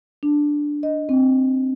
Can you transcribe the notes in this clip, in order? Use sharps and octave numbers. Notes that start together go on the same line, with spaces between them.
D4
D#5
C4